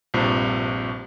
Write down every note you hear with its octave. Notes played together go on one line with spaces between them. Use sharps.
A#1 G2 C3 F3